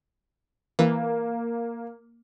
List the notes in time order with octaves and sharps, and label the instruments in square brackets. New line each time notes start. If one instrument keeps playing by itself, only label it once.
[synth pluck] E3 [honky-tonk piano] A#3